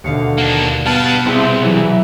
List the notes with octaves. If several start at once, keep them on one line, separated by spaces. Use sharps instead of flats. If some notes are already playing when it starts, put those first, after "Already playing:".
D#2 B2 D3 F5 C#7
A#3 D4
G3 B3 B4 F5 A5 F6
C2 C4 E4 G#4 B6
E3 F#3 E4